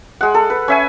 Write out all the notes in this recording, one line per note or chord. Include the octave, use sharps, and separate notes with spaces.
G#3 F#5
A4
B4
C#4 E5 G#5